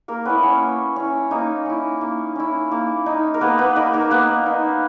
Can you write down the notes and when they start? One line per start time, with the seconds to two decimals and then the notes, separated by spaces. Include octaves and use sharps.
0.08 A#3 A#4
0.25 B3 C#4 E4 B4
0.43 C#4 C#5
0.61 A#3
0.96 C#4 E4
1.31 A#3 D#4 D#5
1.66 C#4 E4
2.01 A#3
2.36 C#4 E4
2.71 A#3
3.06 D#4
3.34 A#4
3.41 A#3 B3 B4
3.58 B3 B4
3.76 A#3 D#4 A#4
3.93 A#3 A#4
4.11 A#3 B3 B4
4.46 D#4